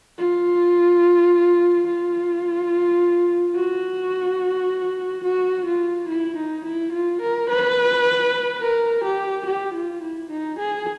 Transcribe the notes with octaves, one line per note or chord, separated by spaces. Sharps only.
F4
F4
F#4
F#4
F4
E4
D#4
E4
F4
A#4
B4
A#4
G4
G4
F4
E4
D#4
G#4